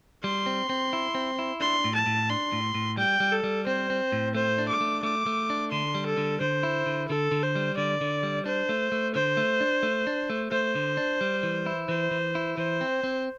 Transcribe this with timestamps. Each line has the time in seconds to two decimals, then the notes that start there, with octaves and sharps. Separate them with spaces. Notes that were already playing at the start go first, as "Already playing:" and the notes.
0.24 G3 C6
0.46 C4
0.69 C4
0.93 E4
1.15 C4
1.39 E4
1.60 D4 C6
1.84 A2
1.95 A5
2.06 A2
2.29 D4 C6
2.53 A2
2.75 A2
2.97 G3 G5
3.20 G3
3.32 A4
3.44 G3
3.67 C4 C5
3.90 C4
4.12 A2
4.35 A3 C5
4.58 D4
4.69 D6
4.81 A3
5.03 A3 D6
5.26 A3
5.50 D4
5.72 D3 C6
5.95 G3
6.07 A4
6.17 D3
6.41 D3 C5
6.63 E4
6.86 D3
7.09 D3 A4
7.31 D3
7.43 C5
7.55 G3
7.77 D3 D5
8.01 D3
8.23 G3
8.46 D4 C5
8.69 A3
8.92 A3
9.15 D3 C5
9.37 A3
9.61 D4
9.83 A3
10.07 D4
10.30 A3
10.52 A3 C5
10.75 D3
10.97 D4
11.21 G3
11.43 E3
11.66 E4
11.89 E3 C5
12.11 E3
12.35 E4
12.57 E3 C5
12.81 C4
13.04 C4